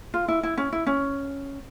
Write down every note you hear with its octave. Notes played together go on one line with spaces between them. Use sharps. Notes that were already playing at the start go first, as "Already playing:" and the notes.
F4
E4
E4
C#4
E4
C#4